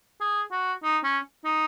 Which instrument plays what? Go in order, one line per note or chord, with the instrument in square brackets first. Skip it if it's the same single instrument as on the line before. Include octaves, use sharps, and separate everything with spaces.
[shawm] G#4
F#4
D#4
C#4
D#4